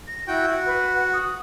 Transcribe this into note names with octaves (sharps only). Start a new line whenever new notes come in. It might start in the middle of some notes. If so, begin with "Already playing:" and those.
A#6
E4 F#4 G5
F#4
B4
F#5
D#6